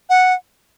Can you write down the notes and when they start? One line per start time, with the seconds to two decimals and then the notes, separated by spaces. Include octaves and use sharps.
0.09 F#5